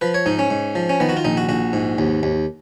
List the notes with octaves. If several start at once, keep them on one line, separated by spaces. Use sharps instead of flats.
F3 B4
C#5
G#2 D#4
C#4
G#2
F3
C#4
D#3 B3
F#4
F4
A#1 D#4
F#4
A#1 F#4
G#2
D#2
D#2